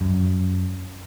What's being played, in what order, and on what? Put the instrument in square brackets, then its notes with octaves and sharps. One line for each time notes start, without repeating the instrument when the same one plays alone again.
[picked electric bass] F#2